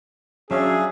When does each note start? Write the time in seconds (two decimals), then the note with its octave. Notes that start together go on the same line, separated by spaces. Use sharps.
0.51 F#3 C#4 D4 G#4 E5 F5